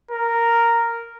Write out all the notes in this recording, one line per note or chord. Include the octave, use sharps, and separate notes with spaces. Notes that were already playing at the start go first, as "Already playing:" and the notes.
A#4